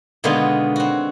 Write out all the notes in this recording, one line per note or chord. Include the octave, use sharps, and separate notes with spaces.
B2 D3 D#3 G#3 B3 F4
C4 F#4